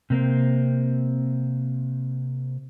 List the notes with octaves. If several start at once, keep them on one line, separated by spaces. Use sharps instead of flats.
C3 A#3 C4